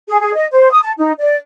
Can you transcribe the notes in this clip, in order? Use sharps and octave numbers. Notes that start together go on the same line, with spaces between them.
G#4
G#4
D#5
C5
D#6
A5
D#4
D5